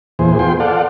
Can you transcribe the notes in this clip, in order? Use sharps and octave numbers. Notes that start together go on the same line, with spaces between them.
E2 A#2 E3 G#4 C5
B3 F4 G#4 G5 C6
A4 D5 F5 F#5